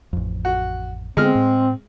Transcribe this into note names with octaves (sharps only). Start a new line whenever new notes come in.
A1 F2
F#4
D3 G#3 B3 C4 F6
A2